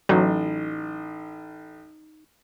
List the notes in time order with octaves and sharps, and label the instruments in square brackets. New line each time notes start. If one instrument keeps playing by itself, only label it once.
[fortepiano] A1 [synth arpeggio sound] F#3 [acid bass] D#4